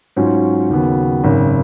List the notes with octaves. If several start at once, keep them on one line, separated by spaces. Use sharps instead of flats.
G#2 F#3 C#4 F4
D#2 C#3 F#3 B3
G#1 F#2 C#3